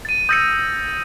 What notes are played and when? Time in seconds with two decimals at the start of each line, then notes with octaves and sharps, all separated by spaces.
0.05 A6 D#7
0.29 D#6 E6 G6 A6 A#6 C#7